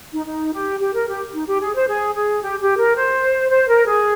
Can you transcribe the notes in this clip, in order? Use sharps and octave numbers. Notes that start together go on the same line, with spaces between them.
D#4
D#4
G4
G4
A#4
G4
D#4
G4
G#4
C5
G#4
G#4
G4
G4
A#4
C5
C5
A#4
G#4